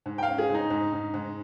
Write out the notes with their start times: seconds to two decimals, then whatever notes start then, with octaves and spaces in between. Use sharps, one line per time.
0.06 G#2
0.18 G5
0.23 F5
0.28 C#4
0.38 G#4
0.49 G#2
0.55 D#4
0.70 G#2
0.92 G#2
1.14 G#2